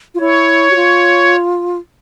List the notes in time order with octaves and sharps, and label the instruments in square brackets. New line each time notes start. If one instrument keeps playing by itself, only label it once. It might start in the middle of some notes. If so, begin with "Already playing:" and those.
[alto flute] F4
[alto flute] E4 [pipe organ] C#5
[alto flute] F#4
F4